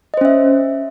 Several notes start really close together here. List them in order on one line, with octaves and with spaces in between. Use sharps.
D#5 C5 C#4 E5